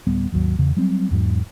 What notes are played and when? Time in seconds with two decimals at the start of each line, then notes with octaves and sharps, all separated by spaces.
0.07 D1 G3 B3
0.32 G#1 D#2 F#3
0.58 E2 C#3
0.77 F#3 G3 C4
1.11 E2 G#2 F#3